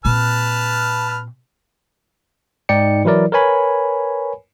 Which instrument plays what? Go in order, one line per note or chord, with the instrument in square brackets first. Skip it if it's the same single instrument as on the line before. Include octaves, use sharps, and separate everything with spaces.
[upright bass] A#2 C4 [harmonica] B4 A5 F6
[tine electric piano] G#2 D#4 D5 G5 C#7
E3 F#3 E4 A#4 D5
A#4 B4 C#5 G#5 B5